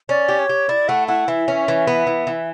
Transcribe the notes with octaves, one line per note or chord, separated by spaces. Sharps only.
C#4 D5
G4
C#5
G4
E4 D5
A3 F#5
E4 F#5
E3 E5
C#4
E3
B3
E3
E3